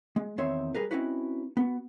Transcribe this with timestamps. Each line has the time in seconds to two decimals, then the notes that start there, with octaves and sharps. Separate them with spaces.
0.16 G#3
0.38 E2 D#3 C4 C#5 E5 C6
0.75 G3 G#4 A#4 B4
0.91 C4 C#4 D#4 E4 F#4 B4
1.57 B3 F#4